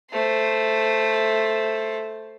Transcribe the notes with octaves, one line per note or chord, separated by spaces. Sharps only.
A3 C5